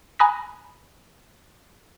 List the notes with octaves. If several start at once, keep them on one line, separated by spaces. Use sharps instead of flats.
G#5 A#5 B5 D#6 F#6 A#6